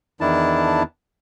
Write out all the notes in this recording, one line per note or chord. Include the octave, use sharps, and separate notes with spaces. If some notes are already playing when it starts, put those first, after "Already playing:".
E2 D#3 D4 E4 A5